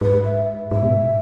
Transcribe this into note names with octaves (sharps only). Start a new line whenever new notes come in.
G#2 B4
E5
G#2 E5
B2
G#2